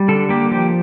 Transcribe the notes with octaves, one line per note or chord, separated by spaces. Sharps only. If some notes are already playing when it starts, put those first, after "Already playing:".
Already playing: G3
D3 A4
A#3 G4
F3 G4